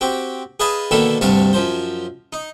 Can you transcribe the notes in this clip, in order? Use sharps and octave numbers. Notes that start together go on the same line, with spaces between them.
C4 F#4 G4
G#4 B4 D#5 F5 G#5 A5
B2 D3 D#3 A#3 E4 A4
D2 G2 C3 F#4 F5 A5
F#2 F3 C5
D#4